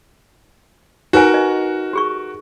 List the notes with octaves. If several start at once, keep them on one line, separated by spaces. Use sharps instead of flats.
D#4 F#4 A#4 B4 G#5
D#5
G4 G#4 C#6